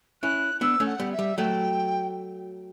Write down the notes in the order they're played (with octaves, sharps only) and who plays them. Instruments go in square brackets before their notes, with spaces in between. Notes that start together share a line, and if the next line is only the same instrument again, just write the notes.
[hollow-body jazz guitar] C#4 E4 [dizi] F#6
[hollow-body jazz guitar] B3 D4 [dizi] E6
[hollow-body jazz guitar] A3 C#4
[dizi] F#5
[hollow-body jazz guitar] G3 B3
[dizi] E5
[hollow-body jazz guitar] G3
[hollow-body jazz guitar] F#3 A3 [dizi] G5